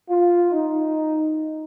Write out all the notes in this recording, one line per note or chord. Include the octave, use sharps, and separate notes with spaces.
F4
D#4